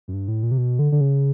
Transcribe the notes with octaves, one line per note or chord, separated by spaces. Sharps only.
F#2
G2
A2
A#2
C3
B2
D3
D3
C#3